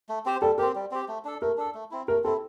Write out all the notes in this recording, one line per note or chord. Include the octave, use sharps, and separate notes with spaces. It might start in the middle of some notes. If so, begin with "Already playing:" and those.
A3
C4 G4 C5
G3 A4
C4 G4 A#4
G3
C4 G4
A3
D4 A4
A3 A#4
D4 A4
A3
C4 E4
A3 A#4
C4 E4 A4